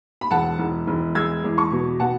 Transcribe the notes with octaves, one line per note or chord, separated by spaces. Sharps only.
B5
E1 F#5 A5
E1
E1
G#3 E6 G#6
E2
A5 C#6
B2
B2 F#5 A5